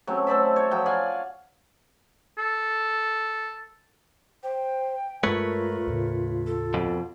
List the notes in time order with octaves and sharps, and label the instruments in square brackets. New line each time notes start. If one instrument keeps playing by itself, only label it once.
[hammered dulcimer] F#3 A3 C4 C#4
A4 C5 D5 E5
C#5
F3 F#3 G5
D5 F5 F#5 G#5
[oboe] A4
[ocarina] C5 [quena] G5
[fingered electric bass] G2 G#3 [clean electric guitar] A3 B4 C#5 [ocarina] F4 [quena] A#4
[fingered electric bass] D#2 A2 C#3
[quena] A4
[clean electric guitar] F2 B2